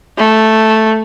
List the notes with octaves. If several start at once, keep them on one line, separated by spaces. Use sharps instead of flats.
A3